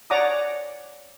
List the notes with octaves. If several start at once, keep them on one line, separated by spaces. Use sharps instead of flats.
C#5 D5 F#5 A#5 D6 D#6